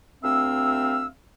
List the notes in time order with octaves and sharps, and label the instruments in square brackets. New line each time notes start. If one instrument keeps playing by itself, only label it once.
[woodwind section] D2 C4 E5 F5 E6